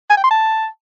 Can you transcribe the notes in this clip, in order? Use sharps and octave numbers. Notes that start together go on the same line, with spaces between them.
G#5
G5
C6
A5